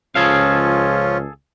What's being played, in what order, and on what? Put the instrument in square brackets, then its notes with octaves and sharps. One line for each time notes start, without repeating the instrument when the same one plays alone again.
[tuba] C#2 [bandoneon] F3 C#4 F4 [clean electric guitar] G#4 A4 F5